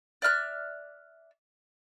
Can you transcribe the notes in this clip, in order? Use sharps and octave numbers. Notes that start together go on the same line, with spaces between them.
D5 E5 F6 F#6